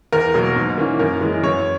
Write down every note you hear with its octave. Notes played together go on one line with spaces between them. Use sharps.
E2 A#4
B2 F#3 A#3
G#2
E3 A#3 C#4
F#2 A#4
E3 G#3
F#2 C#5